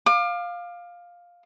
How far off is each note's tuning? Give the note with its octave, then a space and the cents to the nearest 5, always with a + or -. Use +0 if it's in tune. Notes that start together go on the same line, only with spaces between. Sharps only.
F5 +10 D6 +35